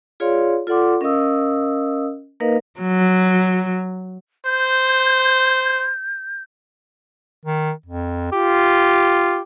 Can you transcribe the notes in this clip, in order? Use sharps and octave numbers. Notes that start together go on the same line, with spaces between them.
F4 G#4 C#5 D5 F5 C6
F4 A4 D5 F#5 C6 D6
C#4 A#4 D#5 F5 D#6 E6
A#3 D#4 A#4 B4 D#5 F5
F#3
C5 G6
D#3
F2
F4 G4